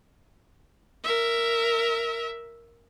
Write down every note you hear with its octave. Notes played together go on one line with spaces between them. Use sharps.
A#4 E5